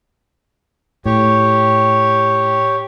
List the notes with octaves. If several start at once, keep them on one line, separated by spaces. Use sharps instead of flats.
A2 G4 C#5